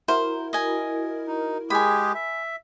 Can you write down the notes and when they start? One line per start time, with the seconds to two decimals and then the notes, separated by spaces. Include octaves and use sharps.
0.08 E4 F#4 A#4 C5
0.53 D#5 G#5
1.27 D#4
1.70 G#3 G4 G#4 G#5 B5
2.15 E5